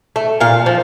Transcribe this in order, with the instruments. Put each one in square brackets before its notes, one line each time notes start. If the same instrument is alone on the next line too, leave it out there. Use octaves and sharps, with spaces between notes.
[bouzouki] A3
A#2 F5
F3